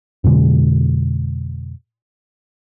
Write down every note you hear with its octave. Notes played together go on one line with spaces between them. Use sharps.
F2 B2 D3 G#3